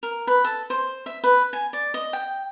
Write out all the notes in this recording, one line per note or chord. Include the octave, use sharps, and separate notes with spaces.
A#4
B4
A4
C5
E5
B4
G#5
D5
D#5
G5